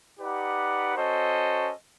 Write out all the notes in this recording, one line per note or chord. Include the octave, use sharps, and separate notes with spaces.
D#4 G4 B4 D5 F#5
C#4 F#4 A4 C5 D#5